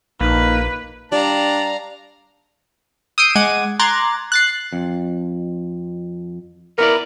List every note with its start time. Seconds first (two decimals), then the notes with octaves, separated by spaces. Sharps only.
0.21 A#1 A#3 D#4 B4
1.12 G3 D4 F5 A5 A#5
3.18 D#6 E6 G6 C7 D7 D#7
3.36 G#3 F#5 D6 G#6 D#7
3.79 A#5 C6 D6 F#6 G#6 A6
4.32 F#6 A6 C7
4.73 F2
6.78 B3 E4 A#4 D5